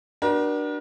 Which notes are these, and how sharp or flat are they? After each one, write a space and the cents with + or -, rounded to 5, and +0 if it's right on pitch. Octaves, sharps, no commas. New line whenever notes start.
D4 +15 F#4 +30 A#4 +45